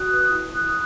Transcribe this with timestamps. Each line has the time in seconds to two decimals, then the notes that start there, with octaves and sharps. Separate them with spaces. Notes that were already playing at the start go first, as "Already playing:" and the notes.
Already playing: F#4 D#6 F#6
0.10 B4
0.32 E4
0.52 E4 D#6 F#6